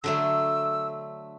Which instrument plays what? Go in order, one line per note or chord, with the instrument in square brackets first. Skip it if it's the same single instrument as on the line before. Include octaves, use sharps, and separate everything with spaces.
[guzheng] D3 F#3 A3 [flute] E6